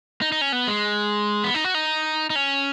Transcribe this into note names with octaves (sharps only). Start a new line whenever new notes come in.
D#4
D#4
C#4
B3
G#3
B3
D#4
F#4
D#4
D#4
C#4